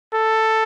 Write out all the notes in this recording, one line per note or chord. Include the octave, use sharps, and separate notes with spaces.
A4